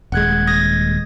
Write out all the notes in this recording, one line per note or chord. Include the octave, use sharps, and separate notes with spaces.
D#1 G#3 F#5 F#6 G#6
D#6 G#6 A#6